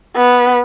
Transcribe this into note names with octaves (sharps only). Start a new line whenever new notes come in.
B3